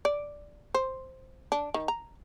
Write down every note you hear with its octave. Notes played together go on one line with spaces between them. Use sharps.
D5
C5
D4
D#3
A#5